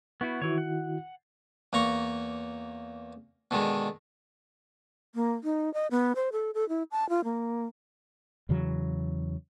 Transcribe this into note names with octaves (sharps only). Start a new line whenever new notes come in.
B3 E4 F#4 C#6
D#3 E3 E4 F#4 C#5
F#5
E2 A#3 A#5 C#6
B2 D3 D#3 G#3
A#3
D#4
D#5
B3
C5
A4
A4
E4
A5
F4
A#3
E2 C#3 E3 F#3